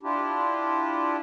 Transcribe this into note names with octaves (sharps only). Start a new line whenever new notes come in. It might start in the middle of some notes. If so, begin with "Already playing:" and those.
D4 E4 F4 G4